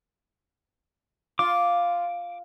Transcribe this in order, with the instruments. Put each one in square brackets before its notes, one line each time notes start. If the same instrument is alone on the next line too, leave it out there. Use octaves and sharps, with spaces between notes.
[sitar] F4 [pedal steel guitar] D6